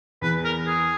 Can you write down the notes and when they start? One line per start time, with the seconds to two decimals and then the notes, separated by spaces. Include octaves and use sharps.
0.22 E2 E3 B4
0.44 A#4
0.67 G#4